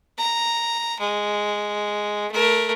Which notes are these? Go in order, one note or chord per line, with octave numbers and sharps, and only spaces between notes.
A#5
G#3
A3 A#4